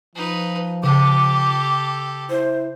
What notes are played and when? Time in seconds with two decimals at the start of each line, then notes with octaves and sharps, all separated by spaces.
0.15 F3 D#4 B4
0.84 C#3 G4 A4 D6
2.30 E4 C5